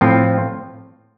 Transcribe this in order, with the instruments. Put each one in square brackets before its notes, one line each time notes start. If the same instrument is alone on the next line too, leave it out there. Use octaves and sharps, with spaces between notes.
[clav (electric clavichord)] A2 F3 C4 F4